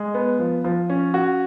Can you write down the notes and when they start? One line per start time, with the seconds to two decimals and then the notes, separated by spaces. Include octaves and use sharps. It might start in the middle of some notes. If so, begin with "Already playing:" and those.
Already playing: G#3
0.14 B3
0.39 F3
0.64 F3
0.89 C#4
1.14 F#4